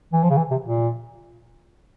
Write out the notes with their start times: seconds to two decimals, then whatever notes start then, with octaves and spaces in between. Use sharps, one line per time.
0.13 E3
0.23 F3
0.30 C#3
0.37 E3
0.51 C3
0.64 A#2